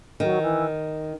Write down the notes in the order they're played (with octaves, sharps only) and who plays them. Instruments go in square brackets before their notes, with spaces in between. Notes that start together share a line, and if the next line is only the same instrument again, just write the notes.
[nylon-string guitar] D#3 [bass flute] F#3
[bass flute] E3